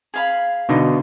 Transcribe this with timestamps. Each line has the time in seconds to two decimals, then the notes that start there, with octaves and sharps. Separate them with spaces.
0.14 G#4 F5 B5
0.69 B2 D3 D#4